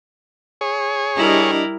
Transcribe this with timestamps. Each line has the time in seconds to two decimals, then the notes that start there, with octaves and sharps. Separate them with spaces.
0.61 G#4 C#5
1.17 G3 D4 E4 G4 A#4 D#5